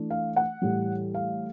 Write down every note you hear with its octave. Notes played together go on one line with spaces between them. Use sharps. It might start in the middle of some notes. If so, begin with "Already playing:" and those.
Already playing: E3 A3 D4
F5
F#5
A2 E3 G3
F5